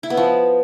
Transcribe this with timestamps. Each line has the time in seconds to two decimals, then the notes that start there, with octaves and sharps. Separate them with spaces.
0.03 E4
0.10 B3
0.17 F3